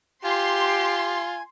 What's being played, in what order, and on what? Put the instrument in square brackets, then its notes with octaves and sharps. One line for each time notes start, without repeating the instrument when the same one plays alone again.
[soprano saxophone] F4 [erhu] G4 [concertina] G#5 [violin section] C6